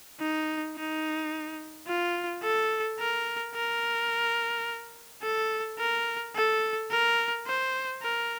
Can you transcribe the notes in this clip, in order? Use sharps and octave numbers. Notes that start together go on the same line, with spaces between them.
D#4
D#4
F4
A4
A#4
A#4
A4
A#4
A4
A#4
C5
A#4